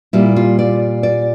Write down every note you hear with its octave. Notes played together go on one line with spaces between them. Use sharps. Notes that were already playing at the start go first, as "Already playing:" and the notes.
A#2 G3 E4
F4
D5
D5